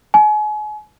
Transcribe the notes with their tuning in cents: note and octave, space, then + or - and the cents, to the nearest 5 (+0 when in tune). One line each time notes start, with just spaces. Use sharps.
G#5 +35